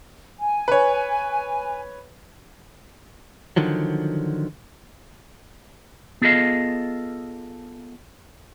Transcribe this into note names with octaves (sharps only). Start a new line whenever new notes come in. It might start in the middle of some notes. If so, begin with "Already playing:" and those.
G#5
B4 C#5
D3 D#3 F3 F#3
B3 F4 G#4 A4 D#5 F5